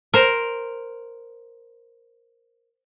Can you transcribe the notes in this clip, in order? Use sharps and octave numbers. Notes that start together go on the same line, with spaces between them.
A#4 C5